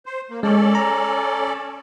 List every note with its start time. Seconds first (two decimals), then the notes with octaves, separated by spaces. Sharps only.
0.06 C5
0.30 A#3
0.43 G#3 C#4 A4 D5
0.75 A#5